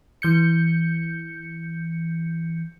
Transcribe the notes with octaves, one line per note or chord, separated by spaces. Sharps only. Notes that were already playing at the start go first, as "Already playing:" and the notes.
E3 G6 C#7